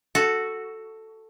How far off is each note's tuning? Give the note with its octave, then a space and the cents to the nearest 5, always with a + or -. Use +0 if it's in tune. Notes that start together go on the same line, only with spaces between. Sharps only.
F#4 +0 A4 +5